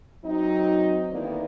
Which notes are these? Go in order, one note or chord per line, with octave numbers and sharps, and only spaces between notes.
F#3 C4 D#4
D3 D#3 A#3 B3 D4 E4